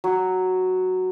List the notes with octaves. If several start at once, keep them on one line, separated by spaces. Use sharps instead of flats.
F#3